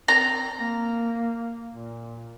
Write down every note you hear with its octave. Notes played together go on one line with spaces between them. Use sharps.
C4 A#5
A#3
A#2